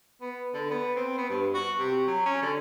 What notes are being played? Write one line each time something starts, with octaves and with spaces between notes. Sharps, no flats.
B3
D3
B3
C4
B3
G2
F#4
C3
F#3
C#4
D3